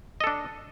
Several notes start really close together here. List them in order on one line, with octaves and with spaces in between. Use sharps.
D#5 A4 D4